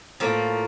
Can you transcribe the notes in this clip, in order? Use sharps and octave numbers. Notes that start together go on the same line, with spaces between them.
A2 F3 A#3